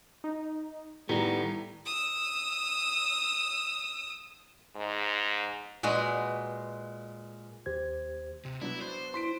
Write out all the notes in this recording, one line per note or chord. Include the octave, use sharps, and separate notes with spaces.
D#4
A2 D#3 G3 B3 A#5
D#6 E6
G#2
A#2 G#3 F#4 B4
D#2 G4 C5 G#6
C3
F#3 B3 D4 E4
C5
E4 C6 B6 D7